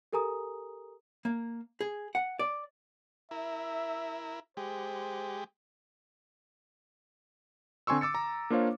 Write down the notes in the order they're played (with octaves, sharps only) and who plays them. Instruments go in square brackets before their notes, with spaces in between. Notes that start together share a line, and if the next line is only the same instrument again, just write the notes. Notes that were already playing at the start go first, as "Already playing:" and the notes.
[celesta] G4 A4 A#4 G#5 A#5 D#6
[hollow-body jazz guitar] A#3
G#4
F#5
D5
[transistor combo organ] E4 A#4 [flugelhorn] E5
[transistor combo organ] G#3 G4 [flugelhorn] C5
[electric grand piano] D3 C4 G#5 C6 C#6 E6
D6 E6 A6 C#7
A#5
A#3 D4 F4 C5 C#5 F5